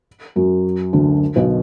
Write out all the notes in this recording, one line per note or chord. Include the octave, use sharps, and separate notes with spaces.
F#2 F#3
D2 D3
B1 B2